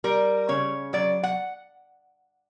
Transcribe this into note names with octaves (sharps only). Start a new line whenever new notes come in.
G3 A#4
C#3 C#5
F#3 D5
F#5